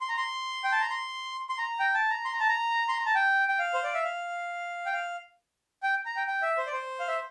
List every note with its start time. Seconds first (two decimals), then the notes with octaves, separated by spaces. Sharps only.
0.01 C6
0.09 A#5
0.17 C6
0.64 G5
0.72 A5
0.81 A#5
0.90 C6
1.49 C6
1.58 A#5
1.80 G5
1.94 A5
2.10 A#5
2.25 C6
2.33 A#5
2.40 A5
2.48 A#5
2.89 C6
2.97 A#5
3.06 A5
3.15 G5
3.48 G5
3.59 F5
3.74 C5
3.83 D5
3.94 E5
4.04 F5
4.86 G5
4.93 F5
5.83 G5
6.06 A#5
6.16 G5
6.27 G5
6.42 E5
6.58 C5
6.67 D5
6.73 C5
7.00 F5
7.08 E5